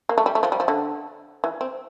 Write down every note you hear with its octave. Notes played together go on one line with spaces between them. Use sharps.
A#3
A3
G3
A3
F3
G3
F3
D3
E3
C4